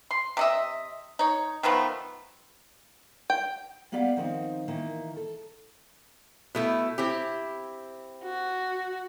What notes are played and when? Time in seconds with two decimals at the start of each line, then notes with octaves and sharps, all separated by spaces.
0.11 C6
0.37 C3 D#5 E5
1.19 D#4 C#5
1.63 D#3 F3 A3 B3
3.30 G5
3.92 A#3 B3 G4 D5 F5 F#5
4.17 D#3 F3 C4 D#4
4.68 D#3 E3 A#3
5.17 A4
6.55 B2 A3 E4
6.98 C4 E4 G4
8.24 F#4